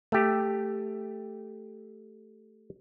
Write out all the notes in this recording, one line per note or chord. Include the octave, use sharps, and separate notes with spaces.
A3 G4